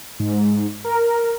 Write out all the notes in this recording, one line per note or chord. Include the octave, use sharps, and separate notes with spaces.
G#2
A#4